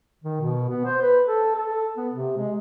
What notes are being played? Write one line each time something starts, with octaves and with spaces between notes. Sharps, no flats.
D#3
B2
B3
C5
B4
A4
A4
B3
C3
G#3